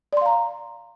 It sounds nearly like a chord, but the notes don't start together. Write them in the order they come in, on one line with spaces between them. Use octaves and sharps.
D5 C6 F5 A#5